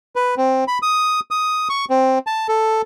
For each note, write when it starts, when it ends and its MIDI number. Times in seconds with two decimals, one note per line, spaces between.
0.16 0.35 71
0.37 0.64 60
0.68 0.78 83
0.82 1.20 87
1.31 1.68 87
1.69 1.85 85
1.90 2.19 60
2.27 2.47 81
2.49 2.82 69